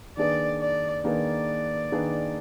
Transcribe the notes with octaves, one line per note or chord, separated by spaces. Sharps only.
D#3 A#3 D4 G#4 B4 D5
D5
D#3 A#3 D4 G#4 B4 D5
D#3 A#3 D4 G#4 B4